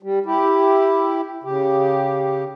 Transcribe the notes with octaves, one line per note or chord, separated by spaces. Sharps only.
G3
E4 G4
C#3 G4